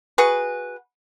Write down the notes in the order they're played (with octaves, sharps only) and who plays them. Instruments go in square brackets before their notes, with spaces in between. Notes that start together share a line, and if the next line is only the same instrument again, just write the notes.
[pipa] F#4 G#4 B4